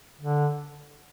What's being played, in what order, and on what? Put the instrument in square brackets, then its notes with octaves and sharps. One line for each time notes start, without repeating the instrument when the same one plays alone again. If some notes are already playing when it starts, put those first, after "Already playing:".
[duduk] D3